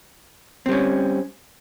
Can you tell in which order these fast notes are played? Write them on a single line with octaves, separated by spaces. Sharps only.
C4 G3 C#4